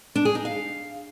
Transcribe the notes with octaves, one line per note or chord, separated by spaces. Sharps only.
D4
G#4
D#4
F5